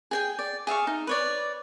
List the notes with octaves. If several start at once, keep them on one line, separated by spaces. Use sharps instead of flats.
G#4 G5 G#5
D5
G#4 E5 F5 C#6
D#4
B4 C#5 D5